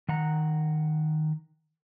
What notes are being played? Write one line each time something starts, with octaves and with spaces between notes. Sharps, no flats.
D#3 F#5 A#5